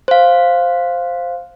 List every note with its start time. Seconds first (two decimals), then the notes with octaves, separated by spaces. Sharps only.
0.08 C5 F5